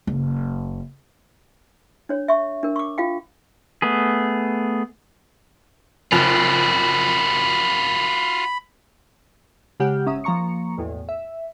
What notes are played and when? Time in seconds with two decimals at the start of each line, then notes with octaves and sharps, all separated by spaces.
0.07 F#1
2.09 D4 C#5
2.28 E5 C#6
2.63 D4 A#4
2.76 C#6 D6
2.98 F4 F5 G5
3.82 A3 B3 G#4
6.12 F#1 F2 F4 F#4 B5 F7
9.80 C#3 G#3 G4 F#5 F6 G6
10.06 G#1 C#4 E5 A#5 D#6
10.24 F3 A#3 A#5 C#6 C#7
10.78 B1 E2 A2
11.09 E5